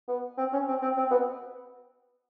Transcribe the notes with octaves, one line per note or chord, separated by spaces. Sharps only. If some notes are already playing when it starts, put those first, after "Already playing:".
B3
C4
C#4
C4
C4
C4
B3